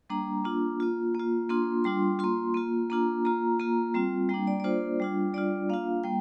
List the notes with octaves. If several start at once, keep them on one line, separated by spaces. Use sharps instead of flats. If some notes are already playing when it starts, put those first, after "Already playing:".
G3 A#3 D4 A#5
A#3 D4 F4
A#3 F4
A#3 F4
A#3 D4 F4 C6
G3 D4 F4 C6
A#3 F4 C6
A#3 F4
A#3 D4 F4 A#5
A#3 F4 A#5
A#3 F4 A#5
G3 C4 F4
G3 A#3 D4 G5
D5
D5
A#3 D4 F4 C5
G3 D4 F4
G3 D4 F4 D5
A#3 D4 F4 F5
G3 A#3 G5